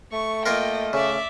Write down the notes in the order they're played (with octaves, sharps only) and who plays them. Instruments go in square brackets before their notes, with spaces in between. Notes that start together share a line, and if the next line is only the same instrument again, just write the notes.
[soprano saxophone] A3 [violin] C#6
[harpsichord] A#3 F4 A#4 [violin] D#5 G5
[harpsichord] C#3 [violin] D5 E5